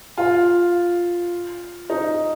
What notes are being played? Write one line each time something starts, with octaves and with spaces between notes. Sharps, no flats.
F4
D#4